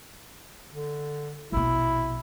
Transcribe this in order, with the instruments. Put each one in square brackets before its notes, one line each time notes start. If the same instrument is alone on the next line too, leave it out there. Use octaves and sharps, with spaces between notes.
[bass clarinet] D3
[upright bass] A#1 B2 [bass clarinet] E4